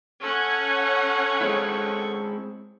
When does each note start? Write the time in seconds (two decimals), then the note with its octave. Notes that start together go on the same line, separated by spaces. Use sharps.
0.23 C#4 A4 C#5 F#5 C#6
1.41 G#3 C4 E4